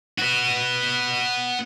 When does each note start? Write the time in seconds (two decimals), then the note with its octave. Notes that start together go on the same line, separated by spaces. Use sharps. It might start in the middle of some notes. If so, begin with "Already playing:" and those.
0.18 B3 F#4